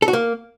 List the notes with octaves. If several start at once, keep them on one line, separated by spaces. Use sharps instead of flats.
A4
F#4
A#3